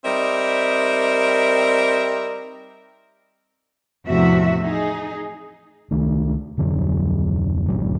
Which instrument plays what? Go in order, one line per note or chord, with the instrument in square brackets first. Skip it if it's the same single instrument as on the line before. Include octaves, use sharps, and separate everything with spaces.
[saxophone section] G3 C4 D#4 A#4 D5 E5
[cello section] E2 A2 C3 F3 F#4 E5
D#4 G#4
[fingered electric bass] C#2 D#3 A3
D1 F2 D3 F#3
G1 D2 A#2 F#3